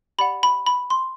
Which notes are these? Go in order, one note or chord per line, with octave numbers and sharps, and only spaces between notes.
G4 D5 F#5 B5
B5
B5
C6